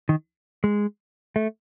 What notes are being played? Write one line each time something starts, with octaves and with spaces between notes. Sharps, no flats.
D#3
G#3
A3